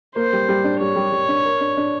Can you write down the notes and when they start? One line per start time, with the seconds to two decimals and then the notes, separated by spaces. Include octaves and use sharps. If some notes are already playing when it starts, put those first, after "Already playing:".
0.16 A#3 C5
0.33 G3
0.49 G3
0.64 D4
0.80 G3 C#5
0.96 G3
1.12 G3
1.28 D4
1.45 A#4
1.60 D4
1.77 D4